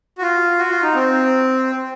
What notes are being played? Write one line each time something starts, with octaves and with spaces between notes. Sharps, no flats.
F#4
F4
F#4
F4
D#4
C4